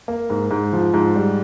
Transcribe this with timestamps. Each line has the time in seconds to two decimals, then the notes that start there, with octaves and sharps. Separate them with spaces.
0.08 A#3
0.30 G#2
0.51 G#2
0.73 F3
0.94 G#2
1.16 G3